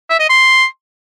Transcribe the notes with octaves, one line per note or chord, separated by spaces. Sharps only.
E5
D#5
C6